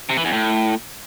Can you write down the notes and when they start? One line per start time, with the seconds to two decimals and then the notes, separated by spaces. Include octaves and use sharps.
0.10 C3
0.17 E3
0.25 E2
0.33 A2